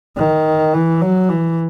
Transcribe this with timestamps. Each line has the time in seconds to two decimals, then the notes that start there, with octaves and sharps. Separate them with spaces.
0.17 D#3
0.74 E3
1.02 F#3
1.30 E3